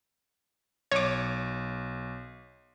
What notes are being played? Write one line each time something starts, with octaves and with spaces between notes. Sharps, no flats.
B1 C#5 D6